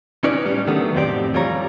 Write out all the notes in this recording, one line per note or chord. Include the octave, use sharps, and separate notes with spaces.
C#4 D#4 B4 D5
A2 G3 C#4
D3 D#3 F#3 A3 B3
F2 A2 C3 C4 G4 D5
F2 E3 G3 F4 C#5 A#5